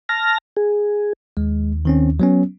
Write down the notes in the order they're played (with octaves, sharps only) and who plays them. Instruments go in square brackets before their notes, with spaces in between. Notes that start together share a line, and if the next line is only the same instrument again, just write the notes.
[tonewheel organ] A5 F6 A#6
G#4
[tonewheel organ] D#2 [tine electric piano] G#3
[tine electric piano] D#3 C4 C#4
F#3 B3 C#4